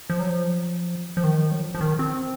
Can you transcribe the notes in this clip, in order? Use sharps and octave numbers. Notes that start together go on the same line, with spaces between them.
F3
F#3
F3
F3
D#3
F#3
F3
F3
D#3
C4